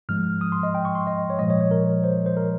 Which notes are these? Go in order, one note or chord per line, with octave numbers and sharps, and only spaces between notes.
G#2 F3 G#3 F6
D#6
C6
D#5
G5
C#6
C6
D#5
C#5
A#2 F3 G#3 D#5
C#5
C#5
A#4
C5
C5
A#4